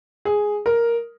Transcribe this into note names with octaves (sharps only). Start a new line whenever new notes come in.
G#4
A#4